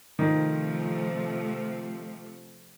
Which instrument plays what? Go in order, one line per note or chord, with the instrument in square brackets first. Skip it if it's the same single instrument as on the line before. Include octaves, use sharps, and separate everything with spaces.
[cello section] C3 F3 A3 [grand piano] D#3